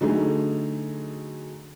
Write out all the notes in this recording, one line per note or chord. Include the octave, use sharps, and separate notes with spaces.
D3 F#3 A3 D#4 G#4